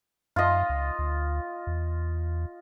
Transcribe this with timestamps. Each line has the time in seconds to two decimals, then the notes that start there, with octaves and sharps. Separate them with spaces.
0.36 F#2 F4 D#5
0.69 C#2
0.99 D2
1.67 E2